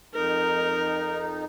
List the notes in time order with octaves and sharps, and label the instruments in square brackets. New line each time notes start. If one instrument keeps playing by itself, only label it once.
[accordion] F2 D#4 [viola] A#4